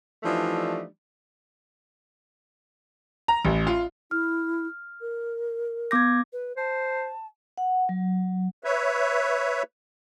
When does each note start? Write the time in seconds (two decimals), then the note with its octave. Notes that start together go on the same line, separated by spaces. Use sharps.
0.24 E3 F3 G3 A3 D4 D#4
3.28 A#5
3.45 A1
3.67 F4
4.11 E4 F6
5.01 A#4
5.91 B3 D6 G6 G#6 A#6
6.32 B4
6.57 C5 A5
7.58 F#5
7.89 F#3
8.64 B4 C#5 E5